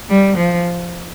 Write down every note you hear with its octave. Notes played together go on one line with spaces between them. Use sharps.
G3
F3